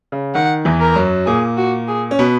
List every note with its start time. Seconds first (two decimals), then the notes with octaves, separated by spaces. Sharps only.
0.12 C#3
0.34 D#3 F#5
0.65 E2 E3
0.81 A#4
0.96 F#2 F#3
1.26 A#2 A#3 G#4
1.57 F#4
1.88 G#4
2.11 C#4
2.19 B2 B3